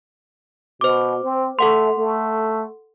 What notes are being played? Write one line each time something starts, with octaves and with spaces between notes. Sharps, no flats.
B2 C5 D6
C4
A3 A4 F#5 C6
A3